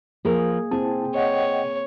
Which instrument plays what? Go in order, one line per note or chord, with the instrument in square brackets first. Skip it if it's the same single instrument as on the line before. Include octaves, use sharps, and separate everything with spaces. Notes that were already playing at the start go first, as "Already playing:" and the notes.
[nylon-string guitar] F3 A#4 [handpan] A#3 G#4
[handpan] C4 [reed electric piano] E4 A5 [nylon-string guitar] G#4
[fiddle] C#5 [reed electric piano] D#5 F#5 G5